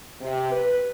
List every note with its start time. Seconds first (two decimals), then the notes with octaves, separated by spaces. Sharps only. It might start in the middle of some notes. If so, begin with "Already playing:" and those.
0.21 C3
0.51 B4